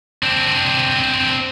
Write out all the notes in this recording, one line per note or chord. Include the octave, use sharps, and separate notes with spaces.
C4 D4